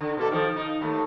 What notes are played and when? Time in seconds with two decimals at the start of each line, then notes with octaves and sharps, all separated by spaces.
0.01 D3
0.17 B2 A#3 A4
0.31 D#3 F3
0.56 D#4
0.81 D#2 A3